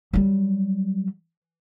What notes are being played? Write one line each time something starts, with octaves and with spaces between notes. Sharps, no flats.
F#3 G3